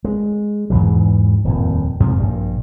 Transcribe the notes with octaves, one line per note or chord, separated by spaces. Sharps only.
G#3
E2 G#2 E3 F#3
D#1 F2 A2
F2 G#2 C3 F3
A#1 G2